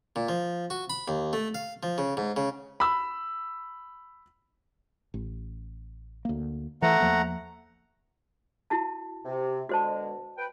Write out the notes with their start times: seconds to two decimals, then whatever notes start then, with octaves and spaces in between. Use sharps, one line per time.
0.16 A#2
0.29 F3
0.70 F#4
0.90 B5
1.08 D#2
1.33 A3
1.55 F5
1.83 F3
1.98 C#3
2.17 G#2
2.36 C#3
2.80 B5 E6
5.14 A1
6.25 D2 A#3
6.82 E3 A3 F#5 A#5
7.01 E2 F3 A#3
8.70 E4 F#4 A5
9.24 C3
9.69 B2 D3 G#3 F#4 C5 A5
10.38 B4 G5